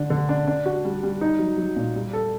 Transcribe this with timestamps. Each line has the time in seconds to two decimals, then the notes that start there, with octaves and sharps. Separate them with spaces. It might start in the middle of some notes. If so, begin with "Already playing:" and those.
Already playing: D3 D4
0.10 D3
0.29 D4
0.47 D4
0.66 F#4
0.85 G3
1.03 G3
1.21 D#4
1.39 F#3
1.58 F#3
1.76 A#2
1.96 G3
2.13 A4